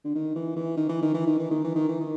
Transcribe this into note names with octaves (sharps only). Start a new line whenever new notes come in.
D3
D#3
E3
E3
D#3
E3
D#3
E3
D#3
E3
D#3
E3
D#3
E3
D#3